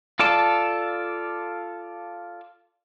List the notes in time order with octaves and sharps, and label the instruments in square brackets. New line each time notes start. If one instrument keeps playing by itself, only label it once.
[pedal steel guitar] F4 A4 D5 A5